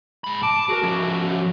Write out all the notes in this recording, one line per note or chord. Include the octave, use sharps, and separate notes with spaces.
G#2 B5
A5 D6
F#4 G#4 A#4
F3 C#4